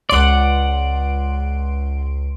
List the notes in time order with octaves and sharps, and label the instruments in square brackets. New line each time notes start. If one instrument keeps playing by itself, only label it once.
[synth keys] C#2 C6 D7 [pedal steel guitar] D5 F#5